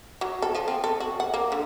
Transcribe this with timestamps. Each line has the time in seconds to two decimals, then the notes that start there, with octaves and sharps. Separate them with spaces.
0.21 F#3
0.42 A4
0.55 F3
0.68 C4
0.84 A4
1.00 F#4
1.20 F#5
1.34 A#3
1.52 D3